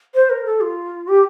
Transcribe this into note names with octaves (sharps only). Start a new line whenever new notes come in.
C5
A#4
A4
F4
G4